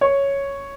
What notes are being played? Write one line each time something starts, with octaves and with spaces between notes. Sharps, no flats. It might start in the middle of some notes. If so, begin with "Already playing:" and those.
C#5